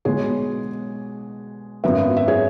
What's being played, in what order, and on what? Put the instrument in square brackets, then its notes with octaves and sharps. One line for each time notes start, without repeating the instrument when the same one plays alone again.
[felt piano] B1 B2 G#3 B3 G#4 C#5
G#1 F#2 F#3 B3 B4 E5
E5
G#4 C#5